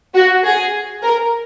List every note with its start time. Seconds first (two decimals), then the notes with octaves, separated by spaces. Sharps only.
0.14 F#4
0.44 G#4
1.02 A#4